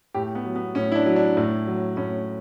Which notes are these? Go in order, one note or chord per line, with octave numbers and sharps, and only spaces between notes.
A2 G4
B3
F#3
B3
A2 C#4
E4
D4
F#3
D4
A2
F#3
A2 C#4